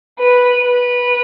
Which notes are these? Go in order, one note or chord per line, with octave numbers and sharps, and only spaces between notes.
B4
B4